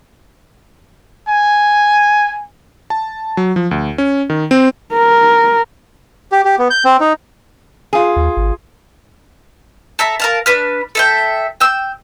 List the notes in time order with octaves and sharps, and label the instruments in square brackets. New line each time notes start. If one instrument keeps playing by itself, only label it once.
[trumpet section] G#5
[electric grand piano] A5
F#3
F3
D2
C#4
D#3
C4
[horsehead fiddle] A#4
[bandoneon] G4
G4
B3
G6
C4
D#4
[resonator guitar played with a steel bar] F4 G#4
[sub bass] D#2
G#1
[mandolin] A4 E5 A#5
A#4 F5 A5
D4 B4 F6
A4 E5 G5
G5 E6